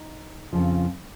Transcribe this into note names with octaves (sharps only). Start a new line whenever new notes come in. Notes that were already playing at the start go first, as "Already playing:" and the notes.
Already playing: D#4
F2 C#3 F3